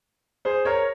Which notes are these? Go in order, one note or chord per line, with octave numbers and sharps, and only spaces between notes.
G#4 C5
A#4 C#5